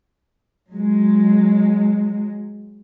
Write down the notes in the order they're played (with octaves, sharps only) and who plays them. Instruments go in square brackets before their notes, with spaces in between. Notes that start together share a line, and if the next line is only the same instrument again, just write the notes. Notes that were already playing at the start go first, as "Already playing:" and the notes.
[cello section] F#3 G#3